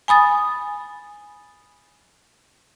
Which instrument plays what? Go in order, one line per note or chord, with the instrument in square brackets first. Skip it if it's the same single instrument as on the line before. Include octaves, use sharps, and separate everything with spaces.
[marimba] G#5 B5 D#6 A6